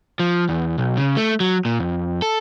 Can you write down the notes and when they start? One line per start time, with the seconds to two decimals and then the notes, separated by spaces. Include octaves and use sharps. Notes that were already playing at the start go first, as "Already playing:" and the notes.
0.20 F3
0.49 E2
0.78 B1
0.97 C#3
1.17 A3
1.40 F#3
1.65 A#2
1.80 F2
2.22 A4